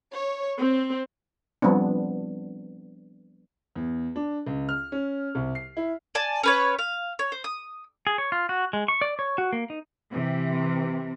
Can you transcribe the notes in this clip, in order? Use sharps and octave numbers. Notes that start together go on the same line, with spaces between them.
C#5
C4
F3 G3 B3 C4 D4
E2
D4
C#2
F6
C#4
C2
C7
E4
D5 G#5 A5
C#4 B4 C#5
F5
C#5
C5
D#6
G#4
C#5
F4
F#4
G#3
C#6
D5
C#5
F#4
A#3
D#4
C3 E3